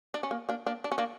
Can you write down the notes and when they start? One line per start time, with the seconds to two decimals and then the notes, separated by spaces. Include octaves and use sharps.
0.14 D4
0.23 C#4
0.31 A#3
0.49 A#3 D4
0.66 A#3 D4
0.84 D4
0.92 C#4
0.98 A#3 D4